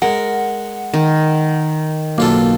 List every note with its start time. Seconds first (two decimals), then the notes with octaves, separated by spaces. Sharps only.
0.02 G#3 A#4 F#5
0.94 D#3
2.18 B1 A#3 F4 A4